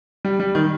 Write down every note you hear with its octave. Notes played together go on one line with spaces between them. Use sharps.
G3
G3
D#3